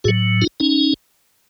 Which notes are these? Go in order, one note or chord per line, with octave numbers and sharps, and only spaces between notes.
A2 F#3 F#4 G#4
D#4 F4
C#4 D#4